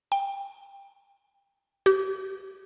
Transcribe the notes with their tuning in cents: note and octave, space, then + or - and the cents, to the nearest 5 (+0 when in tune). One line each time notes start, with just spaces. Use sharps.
G5 +20
G4 -35